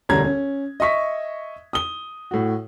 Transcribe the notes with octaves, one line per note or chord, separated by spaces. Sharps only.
E1 D2 G3 C#4 A#5 G#6
C#4
D#5 E5 C#6 B6
D#6 G7
A2 F#4